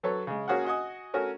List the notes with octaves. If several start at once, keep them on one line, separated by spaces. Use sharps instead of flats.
F#3 A4 B4 C#5
C#3 G#3
A#3 C#4 F#4 G#4 F5 F#5
F#4 D#5 F#5 G#5 D#6
A3 C#4 F#4 A#4